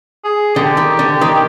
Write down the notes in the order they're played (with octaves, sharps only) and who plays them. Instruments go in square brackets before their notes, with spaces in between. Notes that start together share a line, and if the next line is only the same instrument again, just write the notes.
[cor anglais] G#4
[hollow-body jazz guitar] D3 [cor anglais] G4
[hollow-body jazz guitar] D#3
D3
D#3